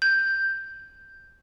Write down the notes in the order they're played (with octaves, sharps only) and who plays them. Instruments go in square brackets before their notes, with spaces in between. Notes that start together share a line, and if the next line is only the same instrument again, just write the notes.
[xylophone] G6